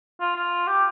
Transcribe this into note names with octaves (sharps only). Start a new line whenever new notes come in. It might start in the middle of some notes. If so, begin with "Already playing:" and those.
F4
F4
G4